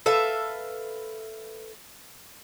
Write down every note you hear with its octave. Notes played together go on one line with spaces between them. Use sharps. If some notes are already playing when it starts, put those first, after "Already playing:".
A4 B4 E5 F5